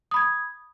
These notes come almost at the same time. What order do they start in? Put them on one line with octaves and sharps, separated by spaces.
D#6 B5 G#6